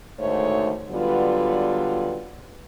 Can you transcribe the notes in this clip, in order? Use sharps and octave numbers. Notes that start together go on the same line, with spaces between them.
D2 G#2 D#3 A3 C5 C#5
D3 F#3 G3 B3 F4 B4